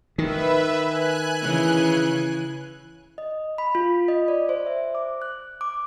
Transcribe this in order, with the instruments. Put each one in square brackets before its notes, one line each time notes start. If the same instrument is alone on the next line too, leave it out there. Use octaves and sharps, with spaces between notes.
[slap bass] D#3 [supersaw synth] B4 E5
[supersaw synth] G#5 F#6
[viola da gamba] C#3 E3
[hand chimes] D#5
B5
F4
D#5
D5
C5
E5
D6
F#6
D6